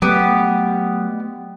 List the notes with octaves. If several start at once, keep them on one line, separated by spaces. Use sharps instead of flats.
F#3 A3 B3 G4